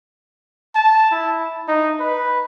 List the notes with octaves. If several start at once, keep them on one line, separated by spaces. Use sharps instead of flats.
A5
E4
D#4
B4